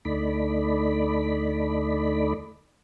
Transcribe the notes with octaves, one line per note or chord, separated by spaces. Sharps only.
D2 A3 D#4 D5 B5